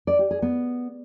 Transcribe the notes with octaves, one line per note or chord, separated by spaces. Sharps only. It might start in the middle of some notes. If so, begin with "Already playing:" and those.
D5
G4
G#4
B3